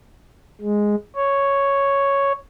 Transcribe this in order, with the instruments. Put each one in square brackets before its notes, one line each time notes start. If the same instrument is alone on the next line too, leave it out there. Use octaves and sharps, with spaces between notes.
[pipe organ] G#3
C#5